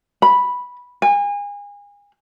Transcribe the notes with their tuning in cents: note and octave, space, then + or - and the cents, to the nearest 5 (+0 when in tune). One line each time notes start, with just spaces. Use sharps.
B5 -5
G#5 -35